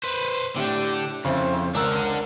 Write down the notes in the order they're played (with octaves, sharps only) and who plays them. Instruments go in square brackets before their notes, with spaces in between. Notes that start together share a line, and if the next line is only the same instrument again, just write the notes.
[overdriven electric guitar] B4 C5
[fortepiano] A2 [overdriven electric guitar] D3 D4 [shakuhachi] G4
[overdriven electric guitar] F2 [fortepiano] C#3 E4 [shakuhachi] C5
[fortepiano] C#2 A#5 E6 [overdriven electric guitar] D4 F#5 [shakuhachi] A#4